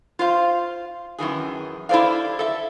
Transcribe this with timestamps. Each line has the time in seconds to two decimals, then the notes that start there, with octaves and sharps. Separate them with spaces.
0.19 F4 C5 F5
1.19 F#2 D#3 E3 G#4
1.89 E4 G4 A4 C5 D5 F5
2.39 A4 E5